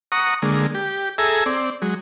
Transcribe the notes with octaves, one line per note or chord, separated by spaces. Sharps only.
F#5 A#5 C#6 D#6
D3 G#3 A#3
G4
G#4 A4 E5 G#5 A#5
C4 D5
F#3 G#3